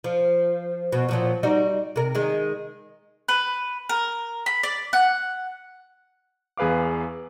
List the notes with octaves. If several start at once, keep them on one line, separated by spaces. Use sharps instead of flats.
F3
B2
A#2 F3 F#3
G3 D#4 F#4
C3 A#4
D#3 G#3
B4
A#4
B5
D5
F#5
E2 G#4 B4 F5 D6